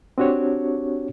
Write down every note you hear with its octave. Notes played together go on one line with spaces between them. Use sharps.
C4 D4 F#4 G4 C#5